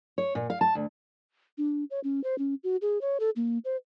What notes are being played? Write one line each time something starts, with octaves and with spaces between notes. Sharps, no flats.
C#5
A#2
F5
A5
D2
D4
C#5
C#4
C5
C#4
F#4
G#4
C#5
A4
A#3
C5